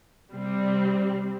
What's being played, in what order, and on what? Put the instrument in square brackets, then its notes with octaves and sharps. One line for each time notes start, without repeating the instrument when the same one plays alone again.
[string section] C3 G3 C4